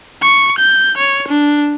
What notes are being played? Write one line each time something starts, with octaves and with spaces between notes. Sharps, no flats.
C#6
G6
C#5
D4